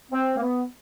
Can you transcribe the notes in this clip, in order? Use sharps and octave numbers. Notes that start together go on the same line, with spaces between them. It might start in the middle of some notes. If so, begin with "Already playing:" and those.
C4
A#3
B3